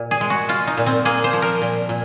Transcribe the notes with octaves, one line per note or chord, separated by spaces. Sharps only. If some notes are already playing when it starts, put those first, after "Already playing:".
Already playing: A#2
G#4
G#3
F#4
G#3 F4
D#4
A#2
C4
A#3 G#4
C5
F3
A#4
A#2
A#2